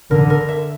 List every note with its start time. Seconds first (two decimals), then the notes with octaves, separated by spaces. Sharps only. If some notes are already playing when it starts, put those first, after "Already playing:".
0.11 D3 A#4
0.30 A#4
0.49 E5